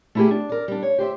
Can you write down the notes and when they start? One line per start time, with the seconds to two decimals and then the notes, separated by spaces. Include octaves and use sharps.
0.15 A3 A#3 E4 F4 G4 G#4
0.31 D4
0.49 A#4 D5
0.68 G3 D4
0.83 C#5
0.98 G4 C5 D5 E5